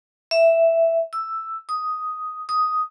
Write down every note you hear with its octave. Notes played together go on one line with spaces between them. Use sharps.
E5
E6
D#6
D#6